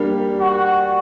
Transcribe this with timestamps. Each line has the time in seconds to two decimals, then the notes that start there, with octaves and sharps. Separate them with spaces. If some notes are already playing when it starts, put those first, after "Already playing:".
Already playing: G3 A#3 D4 G4
0.39 F#4